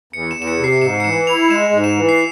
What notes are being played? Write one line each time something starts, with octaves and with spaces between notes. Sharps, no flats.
E2 C#7
E7
E2
E7
C#7
C3
C7
G#2 E7
C#7
E3 E7
E4 F7
G#3 E7
G#2
E7
E3
C7